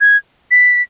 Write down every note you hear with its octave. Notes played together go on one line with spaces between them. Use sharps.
G#6
B6